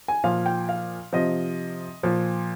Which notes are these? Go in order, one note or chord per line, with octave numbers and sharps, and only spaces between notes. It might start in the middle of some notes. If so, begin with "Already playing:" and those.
G#5
A#2 F3 F5
G5
F5
C3 F3 D#5
A#2 F3